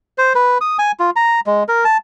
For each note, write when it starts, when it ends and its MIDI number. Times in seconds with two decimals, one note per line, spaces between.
0.18 0.33 72
0.35 0.58 71
0.61 0.77 87
0.79 0.92 80
0.99 1.10 65
1.16 1.40 82
1.46 1.63 56
1.68 1.84 70
1.85 1.97 81